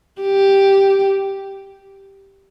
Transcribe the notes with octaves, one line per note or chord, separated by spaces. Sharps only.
G4